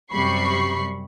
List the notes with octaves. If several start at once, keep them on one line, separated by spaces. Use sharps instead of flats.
F#2 C3 G3 B5 C#6 C7